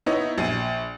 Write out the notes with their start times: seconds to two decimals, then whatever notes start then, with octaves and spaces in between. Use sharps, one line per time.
0.06 B3 D#4 E4 C#5 D#5
0.38 A#1 C7 D#7